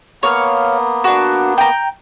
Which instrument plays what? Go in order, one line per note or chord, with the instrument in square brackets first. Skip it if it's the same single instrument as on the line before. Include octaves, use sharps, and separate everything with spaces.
[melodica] A#3 B3 [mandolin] C#5 F5
[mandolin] D4 F#4
G5 A#5